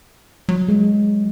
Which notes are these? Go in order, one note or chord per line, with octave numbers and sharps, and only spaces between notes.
F#3
G#3